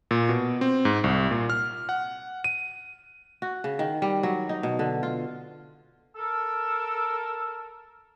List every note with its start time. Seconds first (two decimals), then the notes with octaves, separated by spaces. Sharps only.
0.11 A#2
0.29 B2
0.61 C4
0.85 G#2
1.04 C2
1.31 A#2
1.50 F6
1.89 F#5
2.44 D#7
3.42 F#4
3.64 C#3
3.79 D#3
4.02 G3
4.23 F#3
4.49 D#4
4.63 B2
4.79 D3
5.03 F4
6.16 A4 A#4 E6